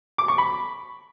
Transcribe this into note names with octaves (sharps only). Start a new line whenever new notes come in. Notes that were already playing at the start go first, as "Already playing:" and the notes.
D6
C#6
B5